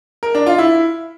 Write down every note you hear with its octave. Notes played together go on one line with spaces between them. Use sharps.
A#4
D4
F4
E4